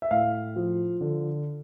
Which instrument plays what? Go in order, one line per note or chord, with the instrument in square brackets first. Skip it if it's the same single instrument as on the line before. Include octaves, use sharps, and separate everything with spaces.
[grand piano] E5
A2 F5
F3
D3